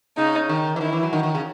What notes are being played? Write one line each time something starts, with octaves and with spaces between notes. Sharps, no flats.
C#3 D#4
D#3
E3
D#3 E4
E3
F#3
D#3
D#3
C#3